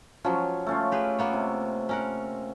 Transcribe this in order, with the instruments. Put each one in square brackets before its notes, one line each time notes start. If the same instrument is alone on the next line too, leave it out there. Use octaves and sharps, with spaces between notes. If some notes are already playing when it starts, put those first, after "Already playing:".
[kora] F3 F#3 [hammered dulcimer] C#4
[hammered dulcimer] A3 C#4 F4
[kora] G4 G#4 B4
A#3 B3 C#5
[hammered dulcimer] C3
[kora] C#4 A#4 F#5